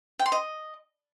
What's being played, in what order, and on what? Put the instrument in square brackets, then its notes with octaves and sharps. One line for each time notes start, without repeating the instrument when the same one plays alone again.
[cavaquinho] G5
C6
D#5